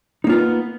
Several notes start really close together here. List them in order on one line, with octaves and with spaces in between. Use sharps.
D#4 A#3 F4 B3